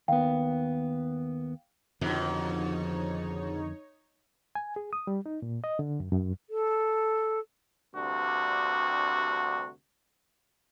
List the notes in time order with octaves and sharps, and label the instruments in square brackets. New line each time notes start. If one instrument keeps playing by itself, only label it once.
[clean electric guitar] D#2 B3 [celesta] F5 G5
[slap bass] F2 D3 D#3 [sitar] G#2 B2 [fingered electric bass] F3 [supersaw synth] D#4 C#5
[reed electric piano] G#5
G#4
D#6
G3
D#4
A#2
D#5
D3
F#2
F#2
[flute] A4
[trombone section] D2 G2 C3 F#4